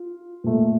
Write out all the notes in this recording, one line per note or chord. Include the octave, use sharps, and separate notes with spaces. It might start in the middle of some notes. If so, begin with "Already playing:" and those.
Already playing: F4
A#2 A3